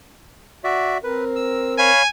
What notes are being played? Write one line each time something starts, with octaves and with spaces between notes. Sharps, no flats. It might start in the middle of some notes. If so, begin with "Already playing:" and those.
F#4 D5 E5
C4 A#4 B4
E6
C#5 F5 G#5 B5